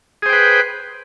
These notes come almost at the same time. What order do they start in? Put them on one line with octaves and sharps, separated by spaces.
G#4 C5 G5 B4